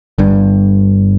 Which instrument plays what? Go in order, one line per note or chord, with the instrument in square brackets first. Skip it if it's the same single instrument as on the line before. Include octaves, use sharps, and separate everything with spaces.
[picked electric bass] G1 G2